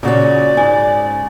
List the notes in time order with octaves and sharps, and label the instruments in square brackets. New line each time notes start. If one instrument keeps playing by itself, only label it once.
[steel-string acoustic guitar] A#2 C#4 [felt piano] C#3 F#4 [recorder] D5
[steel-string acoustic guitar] G#2 [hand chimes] G#5